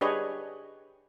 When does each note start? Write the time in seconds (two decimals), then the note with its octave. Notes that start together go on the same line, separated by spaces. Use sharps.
0.01 D4 G4 G#4 B4 C#5 D#5